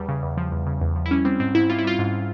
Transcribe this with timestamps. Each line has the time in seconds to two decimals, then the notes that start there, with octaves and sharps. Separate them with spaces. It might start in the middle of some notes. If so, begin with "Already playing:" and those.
Already playing: E2 G3
0.08 C#3
0.23 E2
0.37 F3
0.52 E2
0.66 C#3
0.81 E2
0.96 F3
1.06 E4
1.11 G3 C#4
1.25 G3 C4
1.40 G#2 C4
1.55 G#2 E4
1.70 G3 F4
1.79 E4
1.84 G3 F4
1.99 G#2